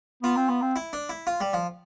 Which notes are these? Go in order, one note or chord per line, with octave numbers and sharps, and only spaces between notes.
B3 F4
C4
B3
C4
E4
D4
E4
F4
G3
F3